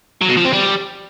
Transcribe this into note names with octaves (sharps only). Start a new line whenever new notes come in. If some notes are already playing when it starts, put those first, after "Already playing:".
F#3
B2
F3
C4
G3